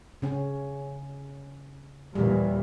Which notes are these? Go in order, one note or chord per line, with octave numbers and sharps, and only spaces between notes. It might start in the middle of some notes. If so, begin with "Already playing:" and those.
C#3 C#4
D#2 A#2 E3 G3